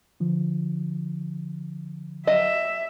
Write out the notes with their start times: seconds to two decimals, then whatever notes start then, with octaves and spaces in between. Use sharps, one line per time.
0.20 D3 F3
2.27 F#3 D#5 E5